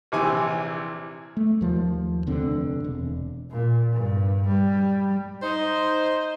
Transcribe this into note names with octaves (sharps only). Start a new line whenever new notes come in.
A#1 C3 E3 G#5 D6
A3
D#2 F3
F1 D3 C4
E1
A#2
G2
G3
D#4 C5